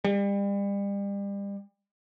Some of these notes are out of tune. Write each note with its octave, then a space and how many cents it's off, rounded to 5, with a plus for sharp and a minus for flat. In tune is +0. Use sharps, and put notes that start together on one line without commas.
G3 +35